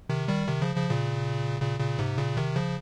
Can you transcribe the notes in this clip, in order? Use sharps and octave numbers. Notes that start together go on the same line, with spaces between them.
C3 D#3
D#3 G3
C3 D#3
C#3 F3
C#3 F3
A#2 C#3
A#2 C#3
A#2 C#3
G#2 C3
A#2 C#3
C3 D#3
C#3 F3